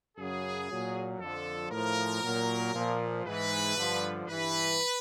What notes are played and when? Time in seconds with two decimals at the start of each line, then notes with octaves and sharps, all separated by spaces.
0.17 F#2 C#3 F#3 G#4
0.69 A#2 F#3
1.19 F2 D3 F3 A4
1.71 A2 F3 A#4
2.23 A#2 F#3
2.74 A#2 F3
3.25 G#2 E3 B4
3.77 G2 D3 F3
4.28 G2 E3 B4